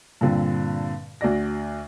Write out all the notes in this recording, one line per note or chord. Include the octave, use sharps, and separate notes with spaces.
G2 A#2 D3 C4
D2 F#4 D5 A#6